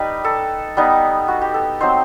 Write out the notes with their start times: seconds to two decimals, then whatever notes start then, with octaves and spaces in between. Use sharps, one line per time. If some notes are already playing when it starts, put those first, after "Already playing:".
Already playing: G3 D#4 B4
0.24 A4
0.77 G3 B3 D#4
1.28 F#4
1.41 G4
1.54 A4
1.80 F#3 C4 D#4 C5